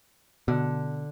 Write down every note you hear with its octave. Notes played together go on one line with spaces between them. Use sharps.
B2 D3